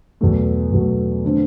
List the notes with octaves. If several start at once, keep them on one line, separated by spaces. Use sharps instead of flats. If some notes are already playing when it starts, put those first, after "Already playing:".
E2 B2 F#3 A3
E2 B2 F#3 A3
D3 A3 C4